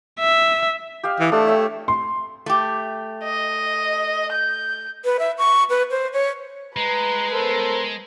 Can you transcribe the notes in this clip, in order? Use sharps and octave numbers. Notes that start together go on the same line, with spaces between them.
E5
G4 D#5 F5
E3
A3 D4 G4
C#5 E5 G5
C6
A3 G4
D#5
G6
B4
E5
C#6
B4
C5
C#5
G#3 B4 A#5
B3 A4 A#4 C5